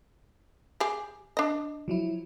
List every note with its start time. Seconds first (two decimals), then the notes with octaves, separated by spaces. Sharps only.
0.80 G4 G#4
1.37 D4 D#5
1.88 F3 F#3 E4